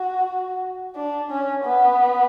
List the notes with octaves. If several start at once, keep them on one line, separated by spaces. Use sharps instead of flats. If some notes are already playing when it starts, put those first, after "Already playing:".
Already playing: F#4
D4
C#4
B3